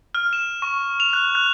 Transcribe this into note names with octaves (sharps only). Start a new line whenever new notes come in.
F6
E7
C#6
F7
F#6
F#6